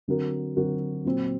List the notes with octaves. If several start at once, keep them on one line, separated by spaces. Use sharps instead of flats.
D3 F#3 C4 F#4 A#4
D3 F#3 C4 F#4 A#4
A#2 F#3 C4